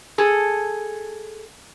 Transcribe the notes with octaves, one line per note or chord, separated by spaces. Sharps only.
G#4 A4